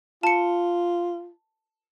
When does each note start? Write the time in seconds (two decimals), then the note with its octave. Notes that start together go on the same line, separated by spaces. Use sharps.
0.23 F4 A5 C#7